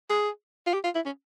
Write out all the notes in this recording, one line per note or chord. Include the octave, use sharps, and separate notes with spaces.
G#4
F4
G4
F4
E4
C#4